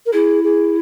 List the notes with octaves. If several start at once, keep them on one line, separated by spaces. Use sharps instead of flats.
A#4
E4 G#4
G#4